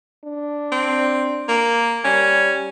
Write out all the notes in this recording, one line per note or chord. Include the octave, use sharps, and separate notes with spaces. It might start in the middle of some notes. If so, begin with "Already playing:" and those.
D4
C4
A#3
G3 C#4